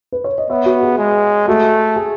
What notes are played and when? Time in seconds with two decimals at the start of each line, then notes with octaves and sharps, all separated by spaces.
0.12 B4
0.24 C#5
0.38 D#5
0.50 B3 C#5 E5
0.66 F#4
0.83 G#4
0.98 G#3
1.48 A3 F#4
1.96 G#4